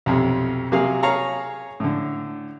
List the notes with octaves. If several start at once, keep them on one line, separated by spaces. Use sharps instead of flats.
B1 F2 C3
C3 F#3 A#3 G#4 F5 F6
G#4 C#5 F5 A5 A#5
A2 D3